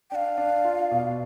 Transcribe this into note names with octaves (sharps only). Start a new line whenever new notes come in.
D4 F5 G5
D4
F4
B2